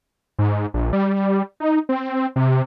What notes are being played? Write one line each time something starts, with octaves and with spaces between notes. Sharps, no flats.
G#2
A#1
G3
D#4
C4
C3